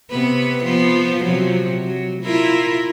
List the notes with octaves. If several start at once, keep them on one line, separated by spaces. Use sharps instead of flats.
C3 B3 B4
F3 B3 F4
C3 F3 F#3
F#3
E4 F4 A#4